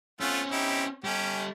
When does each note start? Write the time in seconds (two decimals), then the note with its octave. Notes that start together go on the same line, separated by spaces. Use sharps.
0.21 A3 C4 C#4 F4 F#5
0.52 D#4 E4 G4
1.04 G3 C#4 G4 A4